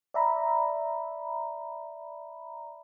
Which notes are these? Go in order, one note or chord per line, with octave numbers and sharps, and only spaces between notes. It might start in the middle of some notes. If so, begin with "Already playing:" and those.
D5 E5 A#5 B5